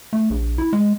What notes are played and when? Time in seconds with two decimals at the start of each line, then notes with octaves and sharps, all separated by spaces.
0.13 A3
0.30 A#1
0.58 E4
0.73 G#3